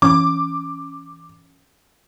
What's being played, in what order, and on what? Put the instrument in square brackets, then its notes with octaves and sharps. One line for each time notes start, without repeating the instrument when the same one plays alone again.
[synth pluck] E3 C#4 [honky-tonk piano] D6